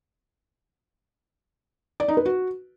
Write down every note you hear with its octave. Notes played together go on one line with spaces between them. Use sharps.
D5
D#4
B4
F#4